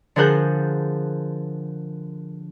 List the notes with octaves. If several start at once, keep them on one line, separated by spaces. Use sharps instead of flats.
D3 F3 G#4 A#4 F#6 G6